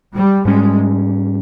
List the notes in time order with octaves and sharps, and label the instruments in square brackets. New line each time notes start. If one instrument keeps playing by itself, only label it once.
[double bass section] G3
[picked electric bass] G#2 G3 C#4 [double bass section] G#3